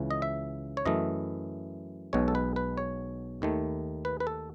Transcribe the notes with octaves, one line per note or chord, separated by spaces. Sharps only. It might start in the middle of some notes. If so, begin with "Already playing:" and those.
Already playing: C#2 C#3 E3
D#5
E5
C#5
F#2 E3 A3 D#5
B1 B2 G#3 C#5
A4
B4
B4
C#5
D#2 D#3 A3
B4
B4
A4